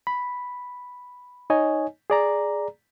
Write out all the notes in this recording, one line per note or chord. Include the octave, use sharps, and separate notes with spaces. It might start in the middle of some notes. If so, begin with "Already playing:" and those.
B5
D#4 C#5 D#5 G#5
G#4 D5 A#5